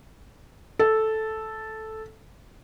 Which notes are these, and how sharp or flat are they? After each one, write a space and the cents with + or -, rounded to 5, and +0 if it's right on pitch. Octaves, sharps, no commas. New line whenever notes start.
A4 -5